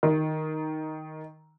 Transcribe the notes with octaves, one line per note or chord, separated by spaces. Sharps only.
D#3